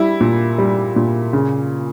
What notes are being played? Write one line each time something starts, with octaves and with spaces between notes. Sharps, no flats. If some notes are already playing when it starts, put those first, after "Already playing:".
Already playing: G3 E4
A#2
G3
A#2
C#3